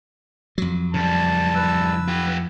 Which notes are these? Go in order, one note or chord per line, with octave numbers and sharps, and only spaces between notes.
F2 F#3
C#3 G3 A5
B4 E6
F4 G4